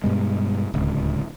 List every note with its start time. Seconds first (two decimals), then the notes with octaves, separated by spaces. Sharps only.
0.04 G2 B2 G#3
0.74 D1 C#2